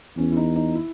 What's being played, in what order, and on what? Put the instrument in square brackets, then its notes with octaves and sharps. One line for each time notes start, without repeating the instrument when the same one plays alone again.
[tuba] E2 [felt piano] C#4
[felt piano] E4
D#4
D#4
E4